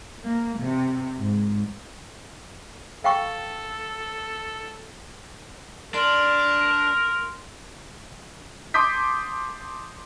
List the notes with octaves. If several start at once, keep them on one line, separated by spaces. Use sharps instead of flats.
A#3
C3
G#2
A4 F5 G5 C#6
D4 A#4 C6
A5 C6 D6 D#6 G6 B6